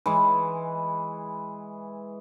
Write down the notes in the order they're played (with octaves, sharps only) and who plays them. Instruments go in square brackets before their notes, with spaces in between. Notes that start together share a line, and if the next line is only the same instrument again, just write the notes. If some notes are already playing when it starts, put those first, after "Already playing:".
[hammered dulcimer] E3 G#3